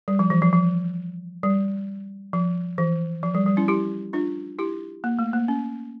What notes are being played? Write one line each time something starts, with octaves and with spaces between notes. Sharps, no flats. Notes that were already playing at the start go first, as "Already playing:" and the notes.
G3
F3
E3
F3
F3
G3
F3
E3
F3
G3
G3
C#4 E4
E4 G4
D4 F4
E4 G4
A#3
A3
A#3
C#4